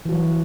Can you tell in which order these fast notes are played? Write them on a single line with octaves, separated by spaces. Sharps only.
E3 F#4 F#3